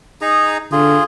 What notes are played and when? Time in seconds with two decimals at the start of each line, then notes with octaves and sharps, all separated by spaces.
0.21 D#4 G#4 A#5
0.72 D3 F4 G#4